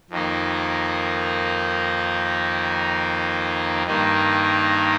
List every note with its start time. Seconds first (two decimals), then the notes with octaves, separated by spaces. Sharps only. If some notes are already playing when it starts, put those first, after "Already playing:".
0.10 F2 D#3 A#3 D#4
3.87 G2 D#3 A#3 D#4